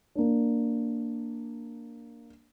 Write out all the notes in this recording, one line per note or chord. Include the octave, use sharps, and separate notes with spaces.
A#3 D4